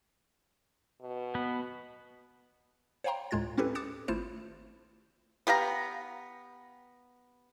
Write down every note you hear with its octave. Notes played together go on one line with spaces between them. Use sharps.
B2
B3
C5 C#5 F5 G5 A#5 C6
D2 A2 G#3 F4 G#6 A6
C4 C#4 E4 G4 A4 B4
D6 D#6 F#6 A6 C#7 E7
G#1 A3 E4 F4 C5 E7
B3 G4 F5 A#5